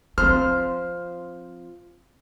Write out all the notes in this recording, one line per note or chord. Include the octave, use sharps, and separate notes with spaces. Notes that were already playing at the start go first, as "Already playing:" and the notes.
F3 C4 C5 F6